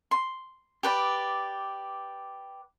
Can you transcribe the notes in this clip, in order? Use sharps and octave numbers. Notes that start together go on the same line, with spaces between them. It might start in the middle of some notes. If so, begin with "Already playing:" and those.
C6
G4 B4 D5